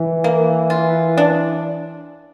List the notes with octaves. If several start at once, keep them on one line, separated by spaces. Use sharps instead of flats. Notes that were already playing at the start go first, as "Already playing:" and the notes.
Already playing: E3
A#3
F4
D4